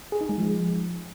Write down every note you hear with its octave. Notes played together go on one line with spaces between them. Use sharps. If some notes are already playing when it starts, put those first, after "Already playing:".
G#4
D#4
G#3
F3